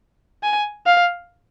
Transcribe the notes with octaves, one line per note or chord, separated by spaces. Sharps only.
G#5
F5